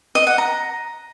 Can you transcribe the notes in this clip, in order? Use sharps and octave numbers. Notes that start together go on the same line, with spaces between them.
D#5
F#5
A#5